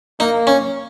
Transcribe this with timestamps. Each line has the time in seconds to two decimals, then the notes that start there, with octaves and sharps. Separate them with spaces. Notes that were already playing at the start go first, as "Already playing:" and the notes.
0.20 A#3 D#4
0.47 C#4